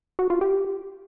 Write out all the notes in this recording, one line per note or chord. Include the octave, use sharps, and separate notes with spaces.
F#4
F4
G4